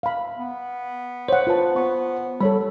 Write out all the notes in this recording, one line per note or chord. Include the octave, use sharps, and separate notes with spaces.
F5 B5
B3
C5 C#5 F#5
F4 B4 A5
B3 C#6
G3 A4 C#5 B5